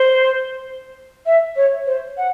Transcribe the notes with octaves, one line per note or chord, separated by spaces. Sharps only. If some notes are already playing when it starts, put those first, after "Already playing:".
Already playing: C5
E5
C#5
C5
F#5